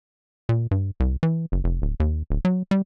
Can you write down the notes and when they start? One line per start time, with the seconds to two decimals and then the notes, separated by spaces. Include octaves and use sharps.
0.49 A#2
0.71 G2
1.00 C2
1.23 E3
1.52 F#1
1.64 F1
1.82 D1
2.00 D#2
2.30 D1
2.45 F#3
2.71 G3